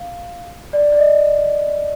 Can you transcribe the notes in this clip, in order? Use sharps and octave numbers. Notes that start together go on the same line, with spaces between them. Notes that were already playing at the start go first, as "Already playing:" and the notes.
Already playing: F5
D5
D5
D#5